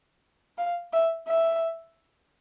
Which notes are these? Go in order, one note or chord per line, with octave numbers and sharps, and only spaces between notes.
F5
E5
E5